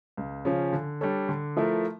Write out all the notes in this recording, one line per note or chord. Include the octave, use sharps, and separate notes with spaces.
C#2
C#3 F3 C#4
D3
G3 D4 A4 C#5
D3
F3 A3 E4 A#4